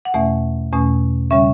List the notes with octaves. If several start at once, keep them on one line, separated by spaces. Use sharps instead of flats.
F#5
E2 B2 A3 C#4 E5
E2 B2 A3 C#4
C#3 G3 C#4 E5